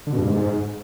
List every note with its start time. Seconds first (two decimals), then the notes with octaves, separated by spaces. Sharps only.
0.07 D3
0.13 B2
0.18 G2
0.24 G#2